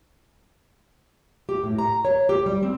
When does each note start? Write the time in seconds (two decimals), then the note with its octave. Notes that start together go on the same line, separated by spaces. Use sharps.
1.49 G4
1.64 A2
1.78 A#5
2.05 C#5
2.29 G4
2.46 G3
2.63 C4